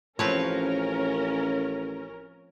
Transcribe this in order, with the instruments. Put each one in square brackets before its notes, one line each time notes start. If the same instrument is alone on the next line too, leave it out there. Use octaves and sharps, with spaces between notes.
[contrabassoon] A1 [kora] F3 [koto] C4 B4 C#5 [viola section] C#4 A#4